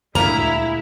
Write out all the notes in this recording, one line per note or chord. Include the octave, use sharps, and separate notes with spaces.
D2 A#2 G#3 A#3 E4 A#5